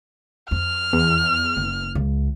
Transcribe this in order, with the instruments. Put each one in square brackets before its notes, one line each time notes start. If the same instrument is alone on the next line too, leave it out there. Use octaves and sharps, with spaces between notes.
[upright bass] F2 [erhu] F6
[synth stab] E2
[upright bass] F#1
C#2